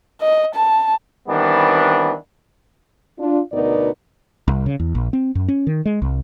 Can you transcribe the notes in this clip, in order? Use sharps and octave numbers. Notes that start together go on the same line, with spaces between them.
D#5
A5
D#3 E3 G3 B3 C4 D4
D4 F4
D2 B2 B3 D#4 A#4 D5
C2
C#3
E2
A#1
C4
F#2
C#4
D#3
G#3
C2